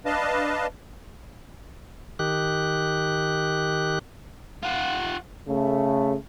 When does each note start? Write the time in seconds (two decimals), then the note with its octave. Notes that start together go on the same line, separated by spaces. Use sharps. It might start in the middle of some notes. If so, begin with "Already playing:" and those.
0.06 D4 B4 D#5 F5 A5
2.19 D#3 G4 F#6
4.63 F4 F#5
5.48 C#3 A3